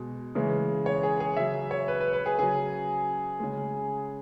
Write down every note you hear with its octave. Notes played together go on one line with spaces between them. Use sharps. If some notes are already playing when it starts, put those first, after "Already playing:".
Already playing: B2 G#3
C#3 E3 G#3
C#5
G#4
G#4
C#3 F#3 E5
C#5
B4
B4
B4
G#4
C#3 F#3 G#4
C#3 G#3